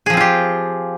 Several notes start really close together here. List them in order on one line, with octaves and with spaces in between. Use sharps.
G#4 F3 C4 F4 G4